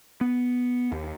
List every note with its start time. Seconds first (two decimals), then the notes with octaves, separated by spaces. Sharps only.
0.21 B3
0.92 D#2